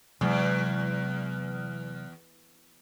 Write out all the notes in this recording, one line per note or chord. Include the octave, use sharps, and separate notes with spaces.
E2 C3 F#3 G#3